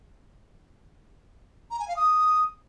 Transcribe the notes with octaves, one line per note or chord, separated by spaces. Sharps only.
A#5
G#5
F5
D#6